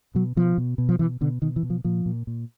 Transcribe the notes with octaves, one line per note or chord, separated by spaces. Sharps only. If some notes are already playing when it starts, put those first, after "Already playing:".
B2 F#3
B2 F3
B2
B2
F3
B2 E3
B2 D3
B2 D#3
E3
B2
F3
A#2 F3
A#2
A#2